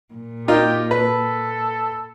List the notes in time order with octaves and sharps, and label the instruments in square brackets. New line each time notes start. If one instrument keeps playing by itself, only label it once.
[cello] A#2
[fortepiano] D#4 F4 A#4 [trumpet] G4
[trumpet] A4 [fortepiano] B4